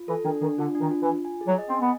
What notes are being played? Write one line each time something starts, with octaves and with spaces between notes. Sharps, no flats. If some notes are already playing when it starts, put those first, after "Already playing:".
Already playing: F4
E3 A4
D#3 D4
D#3 D4
D3 F4
D4
D#3
F4
E3
F4
G#5
G#4
F#3
D#5
C4
G#5
B3